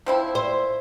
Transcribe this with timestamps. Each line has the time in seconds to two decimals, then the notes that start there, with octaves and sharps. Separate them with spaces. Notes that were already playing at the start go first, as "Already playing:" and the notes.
0.06 F3 C4 E4
0.35 C5